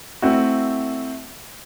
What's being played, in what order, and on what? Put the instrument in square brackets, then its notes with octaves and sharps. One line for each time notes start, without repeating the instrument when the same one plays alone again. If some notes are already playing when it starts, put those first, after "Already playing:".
[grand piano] A3 C4 E4 F#4